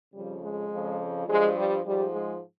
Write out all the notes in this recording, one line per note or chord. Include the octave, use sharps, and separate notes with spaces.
F2 C#3 F3 G3
G#3
F2 C#3 F3
G2 F3 G#3
G3
G#2 F3 G3
G#3